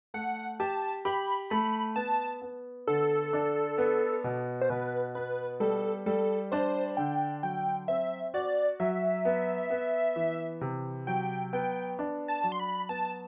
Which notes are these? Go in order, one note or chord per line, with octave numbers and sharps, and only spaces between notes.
A3 F#5
G4 A5
G4 B5
A3 B5
B3 A5
B3
D3 A4
D4
B3
B2
C5
B2 B4
B3 B4
G3 A4
G3 A4
D4 C5
D3 G5
F#3 G5
C4 E5
F#4 D5
F#3 E5
B3
B3
E3
C3
F#3 G5
B3 G5
D4
A5
F#3
C6
B5
B3 A5